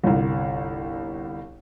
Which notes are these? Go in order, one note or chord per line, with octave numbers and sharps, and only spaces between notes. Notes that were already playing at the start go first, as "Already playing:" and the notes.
G1 C2